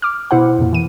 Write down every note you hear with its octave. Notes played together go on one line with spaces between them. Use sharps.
D6 F6
B2 E4 C5 F#5
F2 A#2
E3 D#7